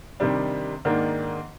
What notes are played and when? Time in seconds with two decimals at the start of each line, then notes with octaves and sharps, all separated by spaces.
0.20 C3 D#3 G3 D4
0.85 G#2 D#3 A#3 D4